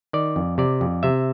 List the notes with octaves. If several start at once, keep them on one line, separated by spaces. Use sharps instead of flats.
D#3 D5
F2
C3 D5
F2
C3 E5